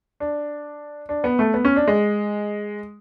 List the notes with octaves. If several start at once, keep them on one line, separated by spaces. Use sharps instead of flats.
D4
D4
B3
A3
B3
C#4
D4
G#3